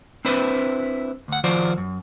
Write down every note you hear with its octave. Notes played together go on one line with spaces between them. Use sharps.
C4 D4 E4 B4 C5
D2 F#5
D#3 F3 F4 F#4 C5 D5
F#2